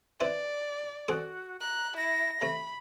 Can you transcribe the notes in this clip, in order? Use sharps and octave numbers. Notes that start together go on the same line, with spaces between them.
C4 E4 B4 D5
C4 F#4 G#4 A4
A#5 F#6
E4 A#6
C3 A3 B5